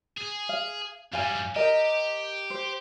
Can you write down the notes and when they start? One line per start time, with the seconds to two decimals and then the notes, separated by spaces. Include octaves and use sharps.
0.17 G#4
0.49 F5
1.13 F#2 G3 F5 G#5
1.56 G4 A#4 D#5
2.50 C5